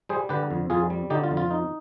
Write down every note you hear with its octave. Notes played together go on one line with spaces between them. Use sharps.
G3 G#4 C5
D3 G4 B4
F2
F2 F4 G#4
G3
D3 D#4 G4
F4
F2
F4
D#4